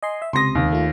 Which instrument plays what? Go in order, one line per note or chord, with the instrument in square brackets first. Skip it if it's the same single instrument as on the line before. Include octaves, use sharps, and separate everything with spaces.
[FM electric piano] D#5 G#5 C6
E5
[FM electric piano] C#2 C3 D#6 [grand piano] C6 A#6
[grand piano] D#2
[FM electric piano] A3 F4